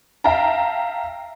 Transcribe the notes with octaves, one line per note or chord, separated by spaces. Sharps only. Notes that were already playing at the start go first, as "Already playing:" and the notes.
E5 F5 G5 A5 A#5